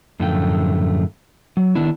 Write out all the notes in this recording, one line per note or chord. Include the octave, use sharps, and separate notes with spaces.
F#2 A2 D3 F3 A3 G5
F#3
D#3 B3 D4 E4